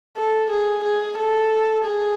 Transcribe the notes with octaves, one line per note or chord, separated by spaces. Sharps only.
A4
G#4
G#4
A4
G#4